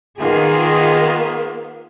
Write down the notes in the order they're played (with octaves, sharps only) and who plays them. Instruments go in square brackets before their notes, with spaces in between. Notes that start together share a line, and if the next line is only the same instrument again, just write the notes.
[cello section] D#3 F4 G#4 [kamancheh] A#3 B3